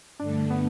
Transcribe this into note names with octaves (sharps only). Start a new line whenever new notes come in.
G2 D3 A3 D4
B3